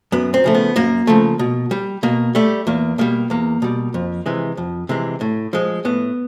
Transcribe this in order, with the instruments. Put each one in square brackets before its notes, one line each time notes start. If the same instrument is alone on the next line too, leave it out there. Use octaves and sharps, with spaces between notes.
[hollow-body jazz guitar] F#2 B3
C4
C#3 F3 A3
B3
F#2 A#3
C#3 F3 A3
B2
G3
B2 A#3
G3 A3
E2 A#3
B2 G3 A#3
E2 A#3
B2 G3
F2
C3 E3 G#3
F2
C3 E3 G#3
A2
F3 G#3
A2 B3